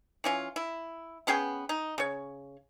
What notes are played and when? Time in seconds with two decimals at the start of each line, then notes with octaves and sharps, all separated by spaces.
0.24 E3 C#4 F4
0.56 E4
1.27 B3 C#4 G#4 G5
1.69 D#4
1.98 C#3 C#5